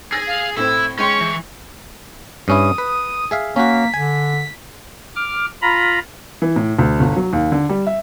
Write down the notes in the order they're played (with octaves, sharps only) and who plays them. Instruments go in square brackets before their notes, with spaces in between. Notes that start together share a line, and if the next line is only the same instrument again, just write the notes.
[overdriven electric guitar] G#4 G#5 [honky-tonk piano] E6 A6 A#6
[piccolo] F5
[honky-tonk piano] A2 C4 [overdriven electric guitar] E4 [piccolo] E6
[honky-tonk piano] G#3 G5 C6 [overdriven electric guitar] C#4 [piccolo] C#6
[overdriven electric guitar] E3
[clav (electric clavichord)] G2 C#4 E4 [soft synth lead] D#6
[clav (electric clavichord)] B4
G#4 E5 F5
[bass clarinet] A#3 [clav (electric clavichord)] C#4 F#4 [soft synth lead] B6
[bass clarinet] D3 [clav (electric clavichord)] G#5
[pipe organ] D6 F6
F4 A#5 B5
[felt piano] E3
A2
D2
G1
F#3
D#2
D3
G3
E5